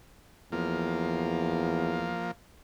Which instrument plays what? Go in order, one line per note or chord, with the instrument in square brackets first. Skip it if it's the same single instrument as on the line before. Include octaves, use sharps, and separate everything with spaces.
[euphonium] E2 [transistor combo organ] F3 A#3